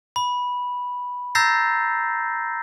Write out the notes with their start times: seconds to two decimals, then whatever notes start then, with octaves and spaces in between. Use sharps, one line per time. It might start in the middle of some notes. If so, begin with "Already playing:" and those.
0.16 B5
1.35 A#5 E6 G6 A6 A#6 C7